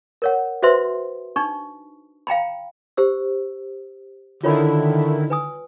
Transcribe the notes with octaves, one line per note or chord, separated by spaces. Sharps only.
A#4 C#5 F#5
F#4 B4 C5 E5 C6
D4 D#4 C#6
F5 G5 A#5 B5
G4 C5 E6
D3 D#3 E4 F4 C#5 B5
B4 G#5 D#6